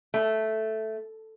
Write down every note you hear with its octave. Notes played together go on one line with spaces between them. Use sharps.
A3